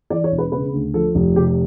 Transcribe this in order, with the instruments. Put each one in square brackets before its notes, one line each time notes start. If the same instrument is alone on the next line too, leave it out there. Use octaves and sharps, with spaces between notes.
[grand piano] E3 D5
C#5
E1
B4
C#3 B4
D2
F3 A4
F1
C3 G4